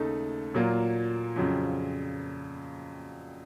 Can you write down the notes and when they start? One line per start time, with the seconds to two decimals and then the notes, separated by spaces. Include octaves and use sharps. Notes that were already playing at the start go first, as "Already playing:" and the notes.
Already playing: D#2 C#3 A3 D#4 A4
0.54 A#2 F#3 A#3 F4
1.36 F2 C#3 F#3 C4